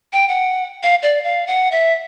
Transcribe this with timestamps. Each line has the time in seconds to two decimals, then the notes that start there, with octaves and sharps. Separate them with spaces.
0.13 G5
0.28 F#5
0.83 F5
1.02 D5
1.24 F5
1.47 F#5
1.71 E5